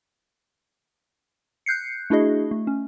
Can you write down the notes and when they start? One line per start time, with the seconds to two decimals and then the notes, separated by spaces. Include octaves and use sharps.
1.66 F#6 G6 C7 C#7
2.10 A3 D4 E4 F#4 G#4 D#5
2.51 A3
2.67 C#4